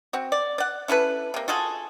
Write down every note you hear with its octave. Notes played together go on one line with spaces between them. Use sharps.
C4 F#4
D5
D5 F#5
C#4 E4 A4 B4
C3 A#3
F4 F#4 G#4 A4